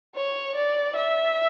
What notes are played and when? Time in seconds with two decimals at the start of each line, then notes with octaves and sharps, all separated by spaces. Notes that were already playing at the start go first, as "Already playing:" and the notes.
0.16 C#5
0.55 D5
0.96 E5